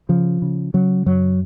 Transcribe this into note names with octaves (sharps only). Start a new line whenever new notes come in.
C#3 F3
C#3
C#3 F#3
F#2 F#3